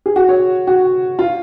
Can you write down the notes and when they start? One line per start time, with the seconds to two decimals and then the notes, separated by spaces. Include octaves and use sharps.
0.06 G#4
0.16 F#4
0.29 C#5
0.67 F#4
1.19 F4